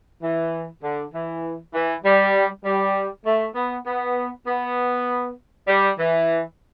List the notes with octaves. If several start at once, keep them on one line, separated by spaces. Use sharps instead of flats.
E3
D3
E3
E3
G3
G3
A3
B3
B3
B3
G3
E3